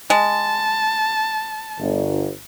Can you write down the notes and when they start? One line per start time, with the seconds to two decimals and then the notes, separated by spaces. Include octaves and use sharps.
0.10 G#3 A5
1.79 G1